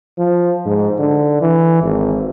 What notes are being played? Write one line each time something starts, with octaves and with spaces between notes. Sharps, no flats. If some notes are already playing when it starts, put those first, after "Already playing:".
F3
G#2
D3
E3
G#1